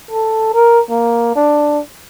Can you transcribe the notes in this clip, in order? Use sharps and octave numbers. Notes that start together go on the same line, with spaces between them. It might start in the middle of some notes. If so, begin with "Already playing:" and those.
A4
A#4
A#3
D4